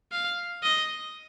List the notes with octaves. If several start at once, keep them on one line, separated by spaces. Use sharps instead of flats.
F5
D#5